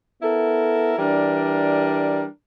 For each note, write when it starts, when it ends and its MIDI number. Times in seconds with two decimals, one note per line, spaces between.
0.22 0.93 59
0.22 0.93 64
0.22 0.93 69
0.22 0.93 70
0.99 2.24 52
0.99 2.24 55
0.99 2.24 62
0.99 2.24 70